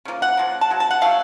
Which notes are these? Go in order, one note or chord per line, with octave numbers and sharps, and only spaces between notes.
C#3 F3 A#3
F#5
C#3 F3 A#3
A5
C#3 F#3
A5
F#5
C#3 F#3 A3 F5